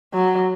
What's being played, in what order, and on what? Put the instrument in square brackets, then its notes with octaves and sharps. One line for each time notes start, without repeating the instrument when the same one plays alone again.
[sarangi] F#3